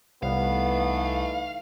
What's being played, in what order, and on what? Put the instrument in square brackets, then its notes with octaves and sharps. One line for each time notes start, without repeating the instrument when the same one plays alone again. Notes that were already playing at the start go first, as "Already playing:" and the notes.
[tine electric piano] C2 [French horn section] E3 A3 D#4 [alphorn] B3 [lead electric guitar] F5